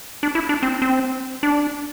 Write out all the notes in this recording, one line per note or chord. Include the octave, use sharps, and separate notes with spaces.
D4
E4
D4
C4
C4
D4